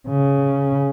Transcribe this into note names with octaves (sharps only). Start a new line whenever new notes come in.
C#3